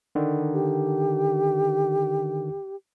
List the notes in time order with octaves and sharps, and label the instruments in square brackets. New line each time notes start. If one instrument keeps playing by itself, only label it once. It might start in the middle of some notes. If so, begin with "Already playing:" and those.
[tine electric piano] D3 D#3
[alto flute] G4